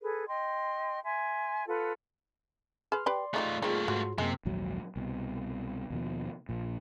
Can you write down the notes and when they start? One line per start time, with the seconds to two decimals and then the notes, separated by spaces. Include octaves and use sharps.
0.01 G#4 A4 B4
0.27 D#5 G5 C6
1.04 E5 G#5 C6
1.67 F4 A4 B4 F#5
2.92 G#4 B4 C6 F6
3.06 G4 B4 D5 G5 C6
3.34 G#3 A3 D#4 F4 G4
3.62 A3 A#3 C4 D#4 F4 G#4
3.88 G#2 F#3 F#4 C6
4.18 F#2 C3 G#3 A#3
4.45 A#1 D#2 G#2 F#3
4.96 C2 B2
5.90 D#2 B2 F3
6.49 A#1 A#2